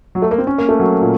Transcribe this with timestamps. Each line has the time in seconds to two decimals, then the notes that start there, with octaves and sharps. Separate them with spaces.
0.15 F#3
0.22 A3
0.31 A#3
0.38 C4
0.47 C#4
0.58 A#3
0.69 A3
0.80 F#3
1.02 A#2